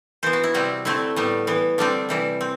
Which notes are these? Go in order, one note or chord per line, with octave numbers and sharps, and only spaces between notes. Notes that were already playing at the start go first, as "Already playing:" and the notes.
E3 B3 C5
F#4
E4
C3 G3 C4 F#4
D3 A3 C4 E4
A2 G3 B3
E3 B3
D3 G3 C4 D4
C3 E3 G3
C4